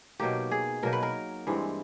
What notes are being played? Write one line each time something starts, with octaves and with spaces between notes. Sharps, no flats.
B2 F#3 A#3 D#4 G4
G#4
B2 F#3 A#3 D#4 A#4
B4
A#4
G2 E3 G#3 C4